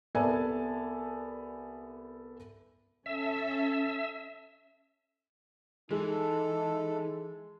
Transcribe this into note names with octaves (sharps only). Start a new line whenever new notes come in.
C2 B3 A4 D5 G#5 A5
C#4 A4 E5
E3 G#3 D#4 A4